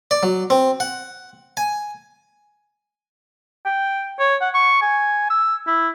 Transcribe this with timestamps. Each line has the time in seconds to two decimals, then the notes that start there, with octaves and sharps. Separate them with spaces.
0.11 D5
0.23 F#3
0.50 C4
0.80 F#5
1.57 G#5
3.66 G5
4.20 C#5
4.41 F#5
4.54 C#6
4.82 G#5
5.30 E6
5.67 E4